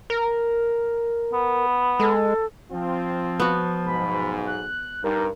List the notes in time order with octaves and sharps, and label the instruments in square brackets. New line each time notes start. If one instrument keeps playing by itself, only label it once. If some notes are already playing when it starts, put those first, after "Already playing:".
[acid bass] A#4
[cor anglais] B3
[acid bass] G#3 [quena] A4
[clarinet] F3 [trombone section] C4 F4
[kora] B3 F#4
[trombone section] B1 G#2 [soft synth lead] B5
[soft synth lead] F#6
[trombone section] G2 [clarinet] D#4 [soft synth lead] A#4